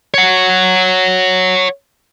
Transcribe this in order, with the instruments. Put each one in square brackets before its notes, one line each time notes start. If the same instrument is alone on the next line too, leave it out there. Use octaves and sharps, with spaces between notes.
[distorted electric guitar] C#5 F#5